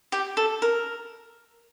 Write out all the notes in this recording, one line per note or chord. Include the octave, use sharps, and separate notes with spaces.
G4
A4
A#4